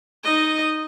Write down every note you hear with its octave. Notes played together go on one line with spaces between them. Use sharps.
D#4 D#5